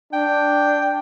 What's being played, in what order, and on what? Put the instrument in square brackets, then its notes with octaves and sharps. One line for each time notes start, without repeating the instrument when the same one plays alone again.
[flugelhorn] D4 [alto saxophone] G5